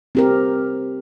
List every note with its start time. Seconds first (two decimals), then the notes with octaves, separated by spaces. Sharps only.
0.15 C4 G4 A#4